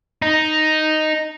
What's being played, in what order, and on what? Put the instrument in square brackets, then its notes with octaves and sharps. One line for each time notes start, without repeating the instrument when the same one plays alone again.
[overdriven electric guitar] D#4